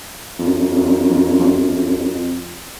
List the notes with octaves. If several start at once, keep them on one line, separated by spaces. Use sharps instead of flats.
F2
F#2
F2
F#2
F2
F#2
F2
F#2
F2
F#2
F2
F#2
F2
F#2
F2
F#2
F2
F#2
F2
F#2
F2
F#2
F2
F#2
F2